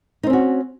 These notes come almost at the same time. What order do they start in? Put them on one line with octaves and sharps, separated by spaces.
D#4 C4 C#4 F#4